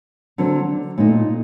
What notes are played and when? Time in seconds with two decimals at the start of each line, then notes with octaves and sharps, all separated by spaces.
0.38 D3 F#3 C4
0.98 A#2 A3 D#4